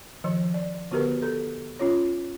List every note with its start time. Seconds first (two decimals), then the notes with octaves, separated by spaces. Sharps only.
0.24 D#3 F3
0.54 D5
0.91 D3 B3 F#4 G4 A#4 B4
1.22 A4
1.79 C#4 F4 C#5